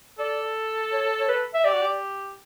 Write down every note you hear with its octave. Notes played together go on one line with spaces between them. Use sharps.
A4 D5
C#5
C#5
B4
E5
G4 D5
F#4
G4